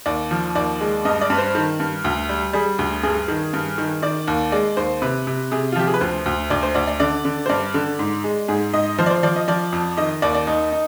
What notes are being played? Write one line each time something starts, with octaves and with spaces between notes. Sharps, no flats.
D#2 D5
F3
D#2 D5
G#3
G2 D#5
D5
G2 B4
C5
D#3
G2
D2
G3
G3 G#4
D2
G2 G#4
D#3
G2
D#3
D#3 D5
D#2
G#3 D5
D#2 C5
C3 B4
C3
C3 G#4
F4
F3 G4
G#4
B4
D2 C5
D2
D2 D5
C5
D2 D5
D5
D3 D5
D3
C5
G2 D5
D3
G#2
G#3
G#2 G#4
G#2 D#5
F3 C5
D5
C5
F3 D5
D#5
F3 D5
F2
D#3 D#5
D#2 D5
D5
D#2 D#4
D#4